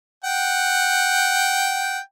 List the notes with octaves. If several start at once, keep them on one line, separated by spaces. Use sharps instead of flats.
F#5 G5